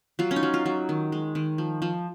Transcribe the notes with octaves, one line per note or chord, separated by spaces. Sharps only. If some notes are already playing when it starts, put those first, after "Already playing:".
F#3 F4
C#4
D#4
F#3
F4
F#3
D#3
G#3
D#3
F3
F3